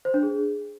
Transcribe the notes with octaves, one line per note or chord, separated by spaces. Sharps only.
C5
D4
G#4